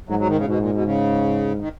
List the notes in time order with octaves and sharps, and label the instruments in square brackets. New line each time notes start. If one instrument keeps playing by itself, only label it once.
[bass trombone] G#2 [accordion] F#3
[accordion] F#3
D#3
C#3
[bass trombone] G#2 [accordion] B2
[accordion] A#2
B2
C#3
D#3